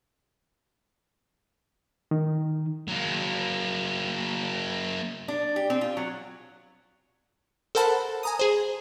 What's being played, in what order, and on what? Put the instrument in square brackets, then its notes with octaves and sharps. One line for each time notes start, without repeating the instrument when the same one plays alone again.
[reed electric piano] D#3
[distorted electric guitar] F#3 A#3
[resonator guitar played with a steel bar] D4
G4
C4
F4
F#3
[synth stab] A4 A#4 C5 F#5 A5 B5
G#5 A#5 D#6
G#4 C5